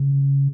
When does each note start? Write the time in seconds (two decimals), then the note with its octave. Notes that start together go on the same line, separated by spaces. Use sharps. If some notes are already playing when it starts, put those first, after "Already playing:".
Already playing: C#3